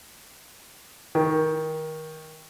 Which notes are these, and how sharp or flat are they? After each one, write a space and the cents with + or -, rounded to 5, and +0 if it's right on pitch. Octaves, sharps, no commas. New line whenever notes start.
D#3 +20